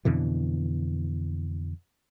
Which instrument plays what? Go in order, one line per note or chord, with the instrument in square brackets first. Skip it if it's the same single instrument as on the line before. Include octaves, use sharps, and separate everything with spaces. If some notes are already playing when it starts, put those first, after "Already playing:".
[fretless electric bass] F2 B2 D3 E3